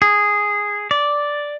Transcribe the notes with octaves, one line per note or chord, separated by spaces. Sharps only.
G#4
D5